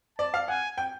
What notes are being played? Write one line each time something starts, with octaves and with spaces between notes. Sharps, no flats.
D5 A5
F5
F#5 G#5
G5